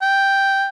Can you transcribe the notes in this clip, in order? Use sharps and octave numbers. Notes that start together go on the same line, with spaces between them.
G5